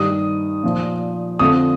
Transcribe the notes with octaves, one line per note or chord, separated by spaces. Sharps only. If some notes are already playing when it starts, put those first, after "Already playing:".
Already playing: G2 D#3 D#6
A#2 F3
F2 D3 F3 D#6